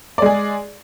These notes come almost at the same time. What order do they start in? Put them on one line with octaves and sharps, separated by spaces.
D5 G#3 G#4